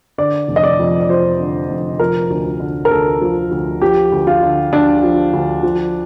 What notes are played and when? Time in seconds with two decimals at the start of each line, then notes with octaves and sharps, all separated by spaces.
0.18 D3 D5
0.48 F1
0.56 D#5
0.64 D5
0.79 F2
1.00 D5
1.09 F3 C5
1.40 D3
1.70 F1
1.99 F3 A#4
2.30 D2
2.60 D3
2.85 A#4
2.91 D2 A4
3.21 F3
3.51 D2
3.82 F3 G4
4.12 D2
4.27 F4
4.43 D3
4.72 D2 D4
5.03 F3
5.33 D2
5.63 F3